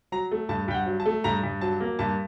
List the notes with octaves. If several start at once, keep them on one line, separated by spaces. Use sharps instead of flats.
F#3 A#5
A3
G2 A5
G2 G5
F#5
F#3
A5
A3
G2 A#5
G2
F#3 A5
A#3
G2 A5